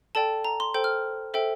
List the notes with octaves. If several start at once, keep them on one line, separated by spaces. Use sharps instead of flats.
A4 D5 G5 A5
A#5
C6
A4 C5 G5 G6
F6
A4 C5 E5 G5